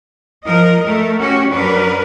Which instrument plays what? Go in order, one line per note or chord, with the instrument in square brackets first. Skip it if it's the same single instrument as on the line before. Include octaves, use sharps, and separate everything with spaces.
[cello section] F3 A#4 D#5
A3 A#4
C#4 F#4 G4 C#5
F#2 F#3 D4 A#4 B4